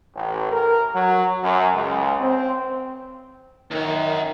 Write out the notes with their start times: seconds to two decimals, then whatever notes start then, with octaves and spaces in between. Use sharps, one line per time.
0.14 A1
0.51 A#4
0.94 F#3
1.43 F#2
1.73 C#2
2.19 C4
3.71 C#2 F#2 D#3